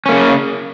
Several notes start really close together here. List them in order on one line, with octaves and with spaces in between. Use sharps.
C#4 A#3 C#3